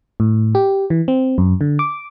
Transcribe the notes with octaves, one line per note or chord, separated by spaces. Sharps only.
A2
G4
E3
C4
F#2
D3
D6